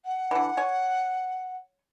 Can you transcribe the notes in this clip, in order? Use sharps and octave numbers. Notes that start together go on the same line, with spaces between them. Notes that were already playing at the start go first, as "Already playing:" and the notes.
F#5
D3 E3
C#5 G#5